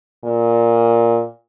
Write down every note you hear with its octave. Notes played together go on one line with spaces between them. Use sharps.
A#2